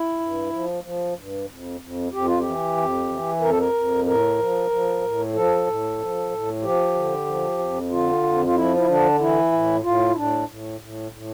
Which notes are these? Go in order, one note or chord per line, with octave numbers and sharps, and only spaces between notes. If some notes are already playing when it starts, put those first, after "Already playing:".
Already playing: E4
G2
F3
F3
G2
F2
F2
F2 G4
F4
E3 G4
F2
E3
F2 A#4
A4
A#4
F2
A2 A#4
F3
F3
A2
F3 A4
A2
F3
A2
F3 G4
D3
F3
F2
D3 F4
F2
F4
F3 E4
E4
D3 D4
E3 E4
A2
A2 F4
E4
A2 D4
A2
A2
A2